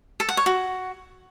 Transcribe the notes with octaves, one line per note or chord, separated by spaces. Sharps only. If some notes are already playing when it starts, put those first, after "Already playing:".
A4
F#5
C#5
F#4